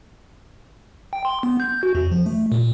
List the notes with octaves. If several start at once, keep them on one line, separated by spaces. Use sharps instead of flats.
G5
C6
B3
G6
F#4
F2
F3
A3
A#2